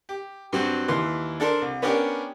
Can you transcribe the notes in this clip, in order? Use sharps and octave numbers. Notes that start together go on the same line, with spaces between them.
G4
G2 F#3 C4 F#4
D#2 E3 C6
D4 A4 A#4 C5
C2
B3 C#4 D4 G4 A#4